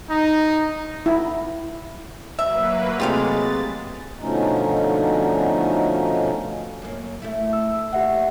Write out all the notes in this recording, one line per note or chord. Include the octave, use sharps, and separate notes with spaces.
D#4
E4
F#3 A#3 B4 E5
C3 G#3 A3 F4 G4 F5 A6
B2 D3 F3 A3 C#4 D#4
F#2 A#3
A3 E4
E6
D#2 G4 E5 F#5